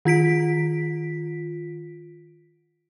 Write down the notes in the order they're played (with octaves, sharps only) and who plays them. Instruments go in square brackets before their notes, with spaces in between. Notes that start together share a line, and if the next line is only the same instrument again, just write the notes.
[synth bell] D#3 F4 B6 D7